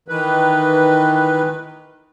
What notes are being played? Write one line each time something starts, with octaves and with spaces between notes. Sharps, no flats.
D#3 E3 B4